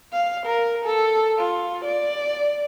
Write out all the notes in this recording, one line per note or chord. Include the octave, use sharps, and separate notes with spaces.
F5
A#4
A4
F4
D5